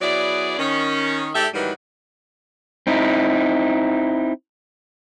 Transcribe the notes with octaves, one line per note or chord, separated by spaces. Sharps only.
F#3 B3 E4 G#4 D5
D#3 C#4
G#2 G4 A4 D5 E5
G#2 D#3 E3 F#3 G3 B4
C4 D#4 E4